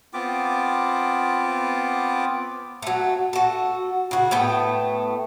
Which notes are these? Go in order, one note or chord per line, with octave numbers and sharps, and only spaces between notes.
B3 C4 F4 D6
F#3 A3
F#4 A4
C#3 F#4
A2 A3 B3 G5